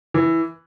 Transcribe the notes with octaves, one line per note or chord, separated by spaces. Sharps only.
E3